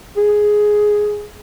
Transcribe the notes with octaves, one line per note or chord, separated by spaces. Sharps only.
G#4